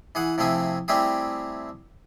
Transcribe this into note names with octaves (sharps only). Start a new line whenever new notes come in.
E3 G#4 F#5
C3 F3 A3 C4 E4 G#4
G3 A3 C4 E4 G4 G#4